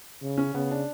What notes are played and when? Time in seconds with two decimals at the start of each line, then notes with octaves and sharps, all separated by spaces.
0.22 C#3
0.38 C#4
0.54 C#3 B3
0.71 D4